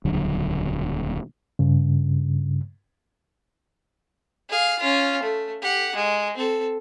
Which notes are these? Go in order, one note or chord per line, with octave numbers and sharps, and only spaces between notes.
D#1 C#2 D3 F#3
G2 C#3
G#4 F5
C#4 F4
A3
G4 F#5
G#3
C4 A4